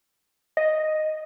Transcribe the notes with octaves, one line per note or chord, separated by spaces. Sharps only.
D#5